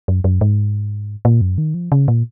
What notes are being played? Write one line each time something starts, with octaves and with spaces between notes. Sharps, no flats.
F#2
F#2
G#2
A#2
F#2
D#3
F3
C#3
A#2